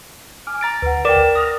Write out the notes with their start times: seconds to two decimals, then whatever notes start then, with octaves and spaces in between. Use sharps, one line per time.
0.47 G#5 D6 F6
0.61 A#5 A6 D7
0.82 D2 B4 F#5
1.05 A#4 D5 G5 D6 E7
1.35 D#6 F6 A#6